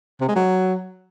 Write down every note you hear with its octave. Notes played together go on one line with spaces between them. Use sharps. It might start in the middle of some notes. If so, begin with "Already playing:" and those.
C3
G#3
F#3